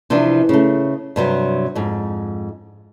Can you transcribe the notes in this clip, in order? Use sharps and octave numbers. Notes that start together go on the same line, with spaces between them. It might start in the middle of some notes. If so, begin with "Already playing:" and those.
C3 E3 F3 C4 D4
C#3 A3
G2 C3 F#3
F2 G#2